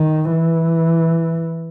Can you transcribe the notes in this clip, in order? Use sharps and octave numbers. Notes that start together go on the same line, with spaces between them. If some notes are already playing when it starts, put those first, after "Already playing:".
Already playing: D#3
E3